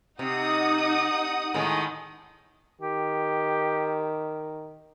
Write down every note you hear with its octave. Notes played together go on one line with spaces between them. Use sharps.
C3 D#4 F#5 D#6
A2 D#3 G#3
D#3 G4